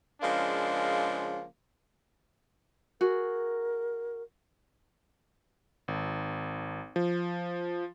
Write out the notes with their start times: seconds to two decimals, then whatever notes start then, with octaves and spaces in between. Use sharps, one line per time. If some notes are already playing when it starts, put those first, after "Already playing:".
0.21 C#3 F3 G#3 A#3 D4
3.01 F#4 G#4 A#4
5.88 G#1
6.96 F3